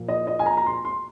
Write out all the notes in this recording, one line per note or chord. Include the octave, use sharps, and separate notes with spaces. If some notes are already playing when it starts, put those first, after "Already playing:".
Already playing: A#2 F3 A#3
D#5
D#5
G#5
A#5
A#5
C6
C6